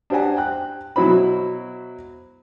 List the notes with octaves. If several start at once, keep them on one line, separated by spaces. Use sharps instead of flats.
D4 G4 C5 F#5 G#5
G5 F#6
B2 F#3 E4 C5 B5